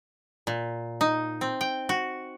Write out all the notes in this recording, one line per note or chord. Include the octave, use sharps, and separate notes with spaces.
A#2
D#4
C4
G5
F#4